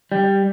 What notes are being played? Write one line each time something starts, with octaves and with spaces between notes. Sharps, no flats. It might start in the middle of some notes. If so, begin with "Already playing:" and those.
G3